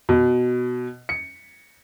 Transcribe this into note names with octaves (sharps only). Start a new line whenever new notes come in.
B2
C#7